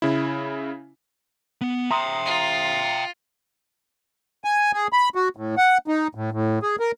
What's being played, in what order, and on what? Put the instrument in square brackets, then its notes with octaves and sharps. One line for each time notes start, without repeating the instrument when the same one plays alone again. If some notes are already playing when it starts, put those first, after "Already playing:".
[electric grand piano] C#3 E4
[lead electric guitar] B3
[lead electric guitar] E5 G5 [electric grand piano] A#5 C6 D#6
[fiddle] F4
[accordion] G#5
G#4
B5
F#4
A2
F#5
D#4
A2
A2
G#4
A#4